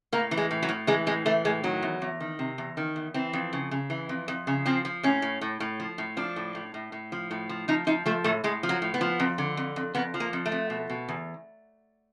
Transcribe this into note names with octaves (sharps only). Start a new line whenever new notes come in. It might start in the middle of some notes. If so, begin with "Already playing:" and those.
A2 A#3
E3
G#3
A2
F#3
A2
E3 G#3
A2 G#3
E3 A3
A2 G#3
D#3 F#3
E2
E2
D#3
C3
E2
D#3
E2
E3 C4
F2
C#3
C#3
E3
F2
F2
C#3
F3 C4
F3
A2 C#4
A2
A2
A2
F3
A2
F3 D4
A2
A2
A2
A2
F3
A2
F3
F3 D#4
F3 D#4
F3 A3
A2 A3
A2 G#3
F3
F#3
A2
B3
F3
F2
D3
F2
F2
F2 B3
F3
A#3
F2
A3
F2
B2
B2
E2